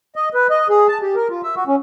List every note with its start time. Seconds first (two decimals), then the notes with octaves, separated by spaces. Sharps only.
0.16 D#5
0.34 B4
0.50 D#5
0.69 G#4
0.88 A5
1.02 G4
1.15 A#4
1.30 F4
1.43 E5
1.56 F#4
1.67 C#4